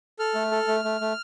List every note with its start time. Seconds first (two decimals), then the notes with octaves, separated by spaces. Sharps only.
0.19 A4 F6
0.35 A3
0.52 A4
0.68 A3
0.84 A3
1.01 A3